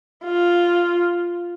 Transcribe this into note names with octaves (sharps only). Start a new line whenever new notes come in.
F4